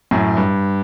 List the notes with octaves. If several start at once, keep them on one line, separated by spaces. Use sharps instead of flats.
F#2 A2
G2